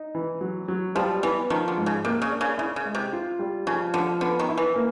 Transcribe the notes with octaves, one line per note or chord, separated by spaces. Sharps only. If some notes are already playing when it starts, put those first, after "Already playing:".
Already playing: D#4
E3
F#3
F#3
F3 G3
E3 B3
D#3 F3
D3
G#2
C#3
C3 A#3
C#3
D4
C#3
C#3 E4
C#3
G#3
C3
F4
G3
C#3 F3
D3 F3
D3 B3
D#3
E4
E3
A#3